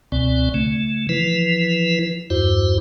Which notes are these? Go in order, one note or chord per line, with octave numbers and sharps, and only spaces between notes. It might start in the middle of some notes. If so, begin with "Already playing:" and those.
C#2 B2 C4 D5
C#3 A3
E3 F3 E4 B4
E2 G2 E4 F#4 C5